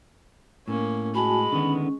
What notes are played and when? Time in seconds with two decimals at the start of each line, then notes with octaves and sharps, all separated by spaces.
0.68 A2 A#3 C#4
1.15 G#3 F#4 G#5 A5 B5
1.52 D3 D#3 B3 C#4